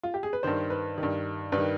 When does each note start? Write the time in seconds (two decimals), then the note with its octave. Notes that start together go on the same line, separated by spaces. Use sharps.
0.03 F4
0.14 G4
0.23 G#4
0.33 B4
0.43 G2 D#3 C5
0.70 B4
0.98 D#3
1.03 G2
1.52 G2 B4
1.58 D#3